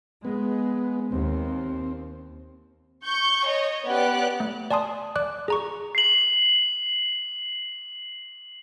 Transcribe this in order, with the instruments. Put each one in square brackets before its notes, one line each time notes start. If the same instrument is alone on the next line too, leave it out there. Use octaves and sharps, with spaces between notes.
[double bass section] G#3 [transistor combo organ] B3
[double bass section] D#2 [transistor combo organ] C4
[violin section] C#6 G6
C#5 D#5
B3 C#4 G4 D5 F#6
[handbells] A3
D5 G#5 A5 C6 D#6
D5 D6 F#6
G#4 A#5 C#6
[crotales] C7 F#7